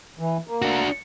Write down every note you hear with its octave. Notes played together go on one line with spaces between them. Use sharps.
E3
A#3
D4 F#4